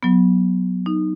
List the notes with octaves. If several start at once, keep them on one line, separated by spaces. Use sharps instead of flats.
F#3 B3
D#4